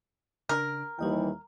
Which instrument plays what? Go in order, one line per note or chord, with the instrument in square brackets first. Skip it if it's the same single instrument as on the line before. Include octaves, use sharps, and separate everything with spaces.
[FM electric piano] C#3 D4 A#5 [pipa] A#4
[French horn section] D#2 E3 [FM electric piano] G3 D#5 G5